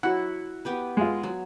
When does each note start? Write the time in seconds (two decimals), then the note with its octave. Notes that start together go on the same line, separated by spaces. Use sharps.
0.03 F#3 E4 F#4 F#5
0.65 B3 G4 B4
0.97 G#3 F4
1.23 F#3